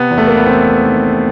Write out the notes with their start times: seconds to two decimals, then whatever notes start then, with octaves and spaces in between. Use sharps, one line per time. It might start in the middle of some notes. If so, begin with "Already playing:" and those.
Already playing: C3 B3
0.11 E2
0.18 A3
0.27 A#3
0.37 B3
0.46 E2 C4
0.82 D#3